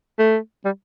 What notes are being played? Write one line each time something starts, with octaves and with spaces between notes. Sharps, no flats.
A3
G3